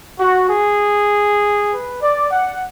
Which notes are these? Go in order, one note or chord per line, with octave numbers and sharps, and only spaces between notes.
F#4
G#4
B4
D5
F#5